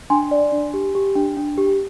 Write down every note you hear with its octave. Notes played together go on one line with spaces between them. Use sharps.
D4 G#5 C6
D5
D4
G4
G4
D4
D4
G4